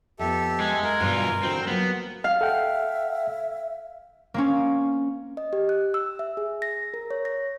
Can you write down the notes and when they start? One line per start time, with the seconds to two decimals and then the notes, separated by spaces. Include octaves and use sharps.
0.19 F2 B3 G4 A4 E5
0.60 G#3
0.83 A#4 F#5
1.01 G2 B2 E3 F4
1.43 D3 E3 C4 F#4
1.67 F#3 A#3 B3
2.24 F5
2.41 A4 E5 F#5 G5
4.34 A#3 C4 C#4
5.37 D#5
5.53 G4
5.69 F#6
5.94 E6
6.19 E5
6.37 G#4
6.62 A#6
6.94 A#4
7.10 C#5
7.25 A#6